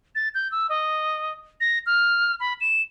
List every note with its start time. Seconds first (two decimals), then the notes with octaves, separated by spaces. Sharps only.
0.15 A6
0.35 G6
0.51 E6
0.69 D#5
1.61 A#6
1.86 F6
2.40 B5
2.61 E7